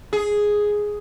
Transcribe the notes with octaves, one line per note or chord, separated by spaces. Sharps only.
G#4